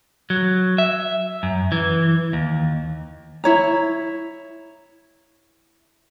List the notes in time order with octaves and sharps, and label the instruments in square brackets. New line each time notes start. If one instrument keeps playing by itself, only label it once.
[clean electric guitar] F#3
E5
F#2
E3
D#2
[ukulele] E4 C#5 A#5